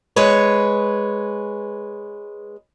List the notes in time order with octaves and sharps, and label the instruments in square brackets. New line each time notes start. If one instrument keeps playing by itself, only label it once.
[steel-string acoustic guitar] G#3 B4 C#5